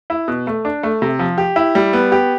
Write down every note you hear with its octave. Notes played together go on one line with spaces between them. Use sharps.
E4
B2
A3
D4
A3
C3
F3
G4
E4
G3
B3
G4